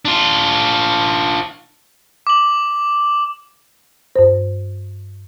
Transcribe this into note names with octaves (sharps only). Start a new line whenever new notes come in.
D4 F4
D6 F#7
G2 C5